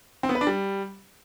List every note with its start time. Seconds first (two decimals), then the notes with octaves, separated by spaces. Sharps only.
0.23 C4
0.29 B3
0.35 B4
0.41 D4
0.47 G3